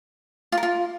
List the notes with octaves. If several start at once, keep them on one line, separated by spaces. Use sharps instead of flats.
F4
A#4
F4